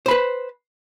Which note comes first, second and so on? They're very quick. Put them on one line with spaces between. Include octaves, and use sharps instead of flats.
C5 B5 B4